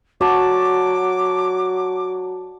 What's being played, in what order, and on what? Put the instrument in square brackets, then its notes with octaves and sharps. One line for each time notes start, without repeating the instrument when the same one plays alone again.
[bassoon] F#3 [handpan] F#4 [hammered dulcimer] D5 A5 [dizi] D6